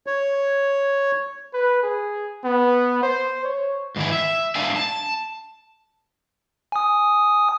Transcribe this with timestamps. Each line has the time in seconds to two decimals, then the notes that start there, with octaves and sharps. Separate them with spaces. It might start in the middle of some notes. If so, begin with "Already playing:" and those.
0.07 C#5
1.54 B4
1.83 G#4
2.45 B3
3.03 C5
3.45 C#5
3.96 G#2 D#3 E3 E4
4.12 E5
4.55 G#3 D4 D5 E5 F5 G#5
4.76 A5
6.72 G#5 D#6